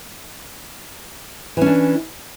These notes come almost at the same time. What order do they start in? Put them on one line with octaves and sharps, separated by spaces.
E3 C#4 D4